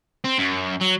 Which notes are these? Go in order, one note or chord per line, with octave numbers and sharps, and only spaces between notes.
C4
F#2
F#3